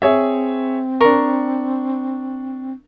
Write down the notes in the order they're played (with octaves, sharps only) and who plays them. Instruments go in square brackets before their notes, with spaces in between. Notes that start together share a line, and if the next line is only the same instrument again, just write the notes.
[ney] C4 [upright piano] G#4 C#5 E5
[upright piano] D4 C#6 [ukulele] A#4